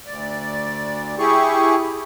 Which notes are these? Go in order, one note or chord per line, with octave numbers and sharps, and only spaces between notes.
D2 D5
E4 G4 G#4 C#6